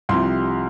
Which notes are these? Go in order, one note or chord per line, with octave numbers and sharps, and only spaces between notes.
C2 C3 F3 C4 C6